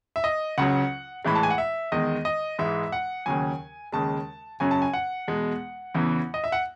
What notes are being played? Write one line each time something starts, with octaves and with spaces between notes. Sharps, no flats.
E5
D#5
C#2 C#3 F#3 F#5
A2 E3 G#3 B5
A5
G#5
F#5
E5
E2 D#3 G#3 D#5
D#5
G#2 E3 G#3 E5
F#5
D#2 C#3 F#3 G#5
D#2 C#3 G#3 A5
F#2 C#3 F#3 G#5
A5
G#5
F#5
E2 B2 G#3
E2 C#3 E3
D#5
E5
F#5